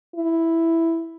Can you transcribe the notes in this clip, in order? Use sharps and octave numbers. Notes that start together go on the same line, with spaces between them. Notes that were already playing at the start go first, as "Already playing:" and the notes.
E4